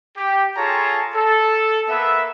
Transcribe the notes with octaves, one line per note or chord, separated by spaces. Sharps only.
G4
F4 G#4 A4 C#5 A5 A#5
A4
A#3 B3 B4 E5